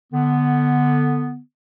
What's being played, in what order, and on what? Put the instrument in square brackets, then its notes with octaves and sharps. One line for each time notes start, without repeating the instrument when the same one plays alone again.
[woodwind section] D3 B3